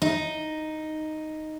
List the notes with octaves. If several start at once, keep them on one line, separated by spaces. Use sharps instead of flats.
D#4